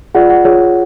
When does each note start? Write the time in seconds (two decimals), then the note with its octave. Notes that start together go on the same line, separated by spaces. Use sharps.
0.14 F4 G#4 D5 F#5
0.30 F#5
0.44 F4 G#4 C#5